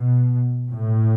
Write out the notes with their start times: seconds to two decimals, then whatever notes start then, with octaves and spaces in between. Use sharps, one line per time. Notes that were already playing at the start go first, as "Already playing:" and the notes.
Already playing: B2
0.71 A2